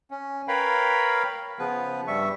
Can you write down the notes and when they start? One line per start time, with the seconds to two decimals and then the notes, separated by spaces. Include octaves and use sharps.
0.11 C#4
0.48 A#4 B4 C#5 F5 G5 B5
1.59 C#3 F3 B3 B4
2.07 G2 G3 E5 C#6